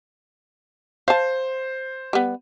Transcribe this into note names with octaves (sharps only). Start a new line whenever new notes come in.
C5 F5 A5
G3 B3